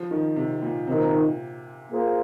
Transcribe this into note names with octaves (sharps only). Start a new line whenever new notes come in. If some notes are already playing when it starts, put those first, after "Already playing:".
Already playing: F3
D#3
C3
A#2
C3 D#3 C4 D#4 A#4
A#2
C3
A#3 F4 G#4 C5